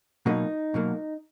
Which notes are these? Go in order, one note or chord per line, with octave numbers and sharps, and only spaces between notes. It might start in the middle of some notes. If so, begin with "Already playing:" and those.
B2 F#3 A#3 D#4
B2 F#3 A#3